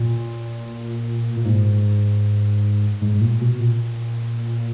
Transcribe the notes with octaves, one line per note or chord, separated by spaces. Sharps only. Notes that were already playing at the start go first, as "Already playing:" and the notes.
Already playing: A#2
A#2
G#2
G#2
G#2
A#2
B2
A#2